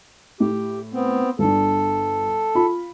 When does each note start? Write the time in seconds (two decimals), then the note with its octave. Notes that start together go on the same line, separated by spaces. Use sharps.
0.40 A2 G4
0.93 B3 C4
1.39 G1 D4 A4
2.55 F4 B5